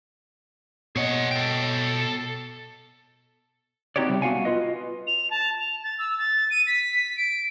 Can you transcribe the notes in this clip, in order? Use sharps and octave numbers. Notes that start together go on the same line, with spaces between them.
B2 G#4 C#5 D#5 F#5
A4 G5
C4 D#4 F#4 G4 C#5 D5
C3 G3
B3 F#4 F5 F#5 G#5
F4 B4 D#5
F7
A5
F7
A6
E6
A6
D#7
B6
D7